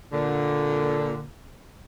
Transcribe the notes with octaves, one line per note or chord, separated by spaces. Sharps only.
A#2 D3